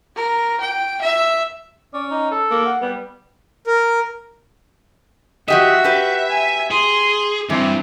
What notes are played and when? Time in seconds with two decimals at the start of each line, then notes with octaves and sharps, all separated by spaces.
0.16 A#4
0.60 G5
1.02 E5
1.94 C#4 D5
2.11 D#4
2.31 A4
2.51 A#3
2.66 F#5
2.82 G3 B3
3.67 A#4
5.48 F3 F#4 G4 D#5 E5 F#5
5.84 G4 B4
6.30 G#5
6.71 G#4 C6
7.50 G2 E3 C4